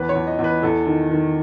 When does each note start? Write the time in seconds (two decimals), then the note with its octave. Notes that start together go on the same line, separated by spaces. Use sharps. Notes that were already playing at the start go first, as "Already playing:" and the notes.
Already playing: E2 E3 B4
0.09 C#5
0.15 E2
0.27 D#5
0.39 E2
0.44 B4
0.62 E2 A4
0.87 D#3
1.11 D#3